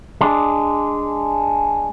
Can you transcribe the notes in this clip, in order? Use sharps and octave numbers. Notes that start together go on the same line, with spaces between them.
G#3 D4